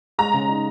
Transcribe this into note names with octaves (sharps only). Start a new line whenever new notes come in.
G#3 A#5
C#3
D#4